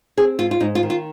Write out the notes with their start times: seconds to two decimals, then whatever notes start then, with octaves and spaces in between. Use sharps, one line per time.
0.17 C4 G#4
0.39 G#2 F4
0.51 F4
0.60 G#2 D#4
0.75 F4
0.83 D#3
0.90 F4